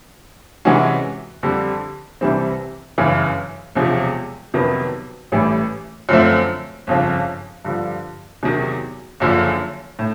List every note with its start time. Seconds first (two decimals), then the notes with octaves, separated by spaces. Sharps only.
0.65 C3 E3 G#3 C#4 F#4
1.43 F2 D3 G3
2.21 C2 C3 E3 G3 C4
2.98 G1 F#2 C#3 E3
3.76 E1 E2 C3 F3
4.54 F2 C3 D#3 F#3 B3
5.32 A1 A2 E3 G3
6.09 F#2 D3 F3 A3 C4
6.87 G1 F2 C#3 F3
7.65 G2 D3 F3
8.43 E2 C3 D#3 F#3
9.20 F#1 F#2 D3 F3
9.99 A2